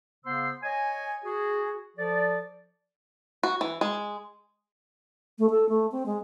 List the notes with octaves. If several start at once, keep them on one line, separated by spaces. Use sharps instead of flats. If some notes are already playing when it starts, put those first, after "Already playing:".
C#3 B3 C5 C6 E6
C#5 D#5 G#5
F#4 G#4
F3 A4 D5
F#4
E3
G#3
A3
A4
A3
C4
G#3